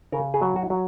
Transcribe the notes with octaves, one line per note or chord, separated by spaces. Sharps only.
C#3 A#4
G#4
F#3
F#4
F#3